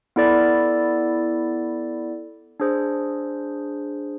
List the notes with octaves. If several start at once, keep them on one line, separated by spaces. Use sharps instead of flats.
B3 E4 A4 D5
D4 G#4 C5